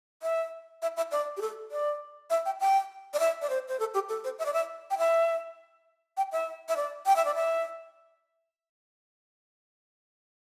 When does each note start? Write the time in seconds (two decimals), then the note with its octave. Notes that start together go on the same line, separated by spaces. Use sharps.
0.23 E5
0.82 E5
0.97 E5
1.12 D5
1.37 G4
1.41 A4
1.71 D5
2.30 E5
2.46 G5
2.61 G5
3.14 D5
3.20 E5
3.42 D5
3.50 C5
3.68 C5
3.79 A4
3.94 G4
4.09 A4
4.24 C5
4.39 E5
4.46 D5
4.54 E5
4.91 G5
4.98 E5
6.17 G5
6.32 E5
6.68 E5
6.76 D5
7.06 G5
7.16 E5
7.25 D5
7.35 E5